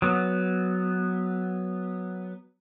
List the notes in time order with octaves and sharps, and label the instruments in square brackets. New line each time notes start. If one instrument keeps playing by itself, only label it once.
[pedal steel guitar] F#3 B3